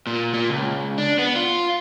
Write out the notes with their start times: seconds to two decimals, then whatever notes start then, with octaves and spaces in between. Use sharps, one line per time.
0.07 A#2
0.34 A#2
0.50 C#2
0.98 D4
1.19 B3
1.36 F4